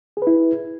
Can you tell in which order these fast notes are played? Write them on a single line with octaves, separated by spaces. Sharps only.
G#4 B4 E4